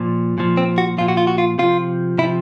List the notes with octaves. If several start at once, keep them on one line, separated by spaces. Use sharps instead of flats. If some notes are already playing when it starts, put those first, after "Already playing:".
Already playing: A#2 F3
A#2 F3
C4
F#4
A#2 F3 F4
F#4
F4
F#4
F4
C3 F3 F4
C3 F3 E4